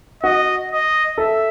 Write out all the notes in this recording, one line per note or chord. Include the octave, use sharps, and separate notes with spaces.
F#4 D#5
D#5
A4 E5